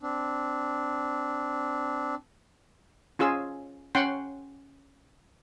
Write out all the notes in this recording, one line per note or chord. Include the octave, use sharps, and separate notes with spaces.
C4 D4
C#4 F4 G#4 E6
C#4 F#5 G5 C6